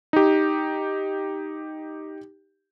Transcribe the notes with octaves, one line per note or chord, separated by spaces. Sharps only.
D#4 G4